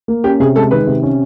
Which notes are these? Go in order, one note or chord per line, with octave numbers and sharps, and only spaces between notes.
A#3
C#4 G4
C3 G#4
G#3 A4
D#3 B4
C3
C#4